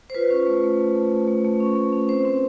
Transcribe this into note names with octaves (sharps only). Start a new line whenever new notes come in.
C5
F4 B4
C#4
A3
A3
A3
A3
A3
A3
A3
C#4
A3
C#4
C4 C5
C4